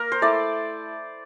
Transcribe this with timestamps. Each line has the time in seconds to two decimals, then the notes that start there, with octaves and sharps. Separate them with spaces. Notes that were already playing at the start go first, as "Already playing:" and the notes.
Already playing: A#3 A#4
0.12 C5
0.22 A3 E4 D5